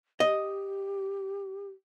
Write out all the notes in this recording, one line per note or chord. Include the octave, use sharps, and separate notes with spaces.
G4 D#5